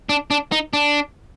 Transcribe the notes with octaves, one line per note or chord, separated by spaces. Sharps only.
D4
D4
D#4
D4